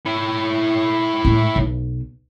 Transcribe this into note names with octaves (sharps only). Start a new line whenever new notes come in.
E4 C#5
A2 G#3
B1